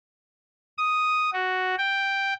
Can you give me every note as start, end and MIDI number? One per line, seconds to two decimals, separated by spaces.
0.78 1.30 87
1.33 1.75 66
1.78 2.34 79